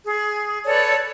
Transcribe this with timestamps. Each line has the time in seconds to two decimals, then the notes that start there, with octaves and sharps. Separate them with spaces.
0.05 G#4
0.65 A4 B4 C#5 D5